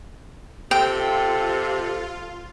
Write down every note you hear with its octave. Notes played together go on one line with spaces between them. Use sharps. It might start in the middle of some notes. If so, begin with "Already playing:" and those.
C3 F4 A4 G5